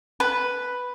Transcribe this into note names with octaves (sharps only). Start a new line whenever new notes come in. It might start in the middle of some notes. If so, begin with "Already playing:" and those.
B4